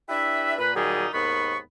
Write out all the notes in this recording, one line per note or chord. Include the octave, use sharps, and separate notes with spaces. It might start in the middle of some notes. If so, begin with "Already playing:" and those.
D4 E4 G4 B4 E5
A#2 B4
A#2 D#3 F#3 G3 D#4 G#4
D#2 G#2 D#3 B3 B5 C#6